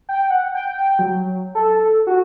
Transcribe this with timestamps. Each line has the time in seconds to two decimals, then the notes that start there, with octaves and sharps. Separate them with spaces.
0.09 G5
0.30 F#5
0.54 G5
0.99 F#3
1.55 A4
2.07 F#4